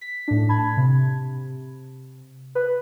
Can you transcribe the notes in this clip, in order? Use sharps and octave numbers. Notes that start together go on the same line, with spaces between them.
B6
A2 D4
A5 B5 G#6
C3
B4